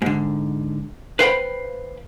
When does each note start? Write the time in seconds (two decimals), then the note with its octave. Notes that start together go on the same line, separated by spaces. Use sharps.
0.02 G#2 D3
1.19 B4 C5 F5 G5 A#5 B5